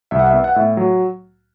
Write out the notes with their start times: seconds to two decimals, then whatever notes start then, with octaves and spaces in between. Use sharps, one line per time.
0.11 C2 E5
0.19 F#5
0.27 E5
0.33 B3
0.44 F#5
0.55 A2 E5
0.77 F#3